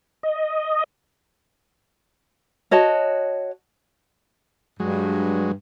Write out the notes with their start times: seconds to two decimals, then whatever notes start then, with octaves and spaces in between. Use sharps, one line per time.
0.23 D#5
2.71 F#4 C#5 D#5 A5
4.80 G2 F#3 G#3